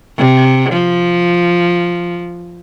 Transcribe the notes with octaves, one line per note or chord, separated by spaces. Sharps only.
C3
F3